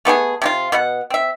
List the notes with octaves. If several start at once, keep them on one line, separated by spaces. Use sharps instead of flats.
A3 B3 G4 G#4
C3 D4 F4
B2 B3 F#5
C4 E5